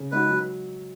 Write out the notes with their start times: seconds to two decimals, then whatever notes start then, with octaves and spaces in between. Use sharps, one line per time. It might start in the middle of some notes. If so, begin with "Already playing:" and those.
Already playing: C#3
0.11 G#3 D#4 F#4 B4
0.30 F#3